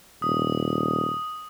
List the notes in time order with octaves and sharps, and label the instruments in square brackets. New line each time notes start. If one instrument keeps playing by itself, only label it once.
[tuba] D#1 [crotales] D#6